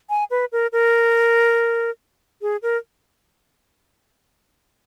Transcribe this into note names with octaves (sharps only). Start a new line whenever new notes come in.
G#5
B4
A#4
A#4
G#4
A#4